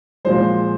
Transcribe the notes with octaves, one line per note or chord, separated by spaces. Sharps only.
A#2 F3 G#3 C5